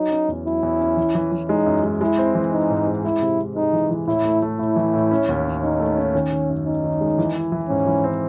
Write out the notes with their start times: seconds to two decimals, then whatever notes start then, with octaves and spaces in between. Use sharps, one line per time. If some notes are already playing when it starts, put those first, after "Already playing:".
Already playing: F#3 D#4
0.11 C#4
0.28 E2
0.46 F#3 E4
0.63 E2
0.80 C#4
0.97 E3
1.15 E3
1.32 E3
1.49 G#3 D#4
1.66 F#2
1.83 G#3
2.01 G#3 E4
2.18 C4
2.35 E3
2.52 C4 D#4
2.70 G#2
2.87 G#3
3.04 G#3 E4
3.22 C3
3.39 C3
3.56 G#3 D#4
3.73 E3
3.91 E3
4.07 A2 E4
4.25 A3
4.42 A3
4.59 A2 E4
4.76 E3
4.94 A2
5.11 C#4
5.28 D#2
5.45 C#4
5.63 C#4 D#4
5.80 A3
5.97 C#4
6.15 D#3 C#4
6.32 D#3
6.49 F#2
6.66 C#4 D#4
6.83 D#3
7.01 G#3
7.18 E3
7.35 E4
7.52 E3
7.69 G#2 C#4
7.87 E3
8.04 C4